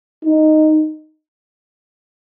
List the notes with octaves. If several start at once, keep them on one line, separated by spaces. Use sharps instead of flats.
D#4